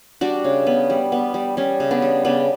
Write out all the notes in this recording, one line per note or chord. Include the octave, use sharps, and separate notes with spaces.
G3 D4 F#4
C#3
B3
G3
B3
G3
G3 C#4
C#3
B3 D4
G3
C#3 B3 D4